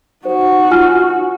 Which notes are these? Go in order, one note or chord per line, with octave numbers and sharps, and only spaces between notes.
D#4 F#4 C5
F4 G#5 F6